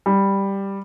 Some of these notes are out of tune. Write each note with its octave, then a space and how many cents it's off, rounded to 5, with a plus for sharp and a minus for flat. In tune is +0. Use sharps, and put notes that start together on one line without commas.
G3 +5